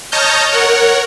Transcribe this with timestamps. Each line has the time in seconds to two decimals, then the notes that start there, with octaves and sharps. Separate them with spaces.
0.12 C#5 D#5 A5 A#5 F6 G6
0.52 A#4 C#5 F#5